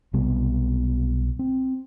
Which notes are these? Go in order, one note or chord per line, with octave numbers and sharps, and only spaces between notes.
B1 C3 G3 B3
C4